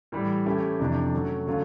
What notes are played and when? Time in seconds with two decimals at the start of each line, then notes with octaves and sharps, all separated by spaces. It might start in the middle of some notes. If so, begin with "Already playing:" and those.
0.12 A2 E3 G3
0.46 E3 A3 C#4 E4 G4
0.79 F2 C3 E3 A3 D4
1.13 F#3 A3 C#4
1.46 D3 F#3 A3 C#4 F4